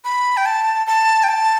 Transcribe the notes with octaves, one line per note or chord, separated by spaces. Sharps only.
B5
G5
A5
A5
G5
A5